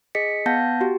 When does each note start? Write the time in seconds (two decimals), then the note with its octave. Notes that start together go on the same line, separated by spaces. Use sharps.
0.15 G#4 D#5 B6 C#7
0.46 B3 F5 F#5 A5 G6 A#6
0.81 F#4 G4